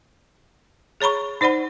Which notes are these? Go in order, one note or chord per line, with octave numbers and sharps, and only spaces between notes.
G#4 C#5 A#5 B5 C#6
D#4 C5 D5 F#5 B5